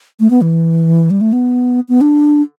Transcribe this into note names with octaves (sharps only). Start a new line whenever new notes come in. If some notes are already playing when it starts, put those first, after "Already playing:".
A3
B3
E3
G3
A3
B3
B3
D4